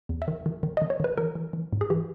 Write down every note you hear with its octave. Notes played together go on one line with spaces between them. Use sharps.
E2
E5
D#3
D#3
D#3
D#3 D#5
C#5
D#3 B4
E3 A#4
E3
E3
G#2
G#4
E3 G4